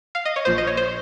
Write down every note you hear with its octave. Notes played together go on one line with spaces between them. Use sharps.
F5
D#5
C#5
A#1 A#2 F3 C5
D#5
C#5
C5